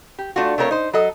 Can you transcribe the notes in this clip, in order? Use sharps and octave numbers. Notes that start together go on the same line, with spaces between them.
G4
A3 D4 F4 F#4
A3 C4 F4 A#4 C#5
D#4 C5
F#3 A4 D#5